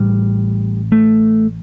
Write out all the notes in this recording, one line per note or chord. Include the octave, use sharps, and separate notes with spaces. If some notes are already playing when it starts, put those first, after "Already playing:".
Already playing: A1 A2 G3
A3